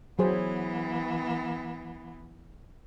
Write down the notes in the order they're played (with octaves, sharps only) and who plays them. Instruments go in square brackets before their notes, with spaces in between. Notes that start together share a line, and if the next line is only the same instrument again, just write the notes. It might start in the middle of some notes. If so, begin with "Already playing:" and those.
[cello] E3 B3 [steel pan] F#3 G#4 C5